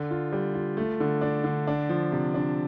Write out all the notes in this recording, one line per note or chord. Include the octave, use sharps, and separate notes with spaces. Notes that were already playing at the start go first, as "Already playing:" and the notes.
Already playing: D3
F4
G3
F4
A3
D3
D4
D3
D4
F3
C3
D4